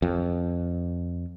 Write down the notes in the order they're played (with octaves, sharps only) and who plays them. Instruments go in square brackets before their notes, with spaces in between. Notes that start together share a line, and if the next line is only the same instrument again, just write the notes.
[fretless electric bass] F2